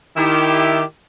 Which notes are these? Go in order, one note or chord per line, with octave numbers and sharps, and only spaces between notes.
D#3 E4 G4